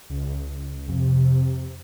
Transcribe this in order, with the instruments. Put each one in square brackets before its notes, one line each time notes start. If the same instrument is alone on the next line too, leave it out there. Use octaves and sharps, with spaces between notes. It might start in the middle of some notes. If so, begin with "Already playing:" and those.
[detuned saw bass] C#2
[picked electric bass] F2 [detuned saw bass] C3